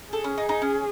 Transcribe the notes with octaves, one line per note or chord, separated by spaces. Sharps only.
G#4 A4
C#4
D#4
D#4
C#4